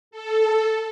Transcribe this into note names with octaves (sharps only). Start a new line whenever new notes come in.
A4